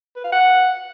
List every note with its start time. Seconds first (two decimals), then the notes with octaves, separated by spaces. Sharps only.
0.16 B4
0.24 F5
0.32 F#5